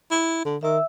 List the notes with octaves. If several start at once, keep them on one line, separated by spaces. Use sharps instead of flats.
E4
D3
D#3 E5 E6